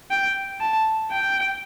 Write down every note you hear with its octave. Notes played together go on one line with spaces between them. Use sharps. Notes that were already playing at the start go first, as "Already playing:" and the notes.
G5
A5
G5